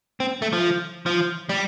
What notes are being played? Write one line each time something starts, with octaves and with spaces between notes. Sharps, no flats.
C4
A3
F3
F3
G3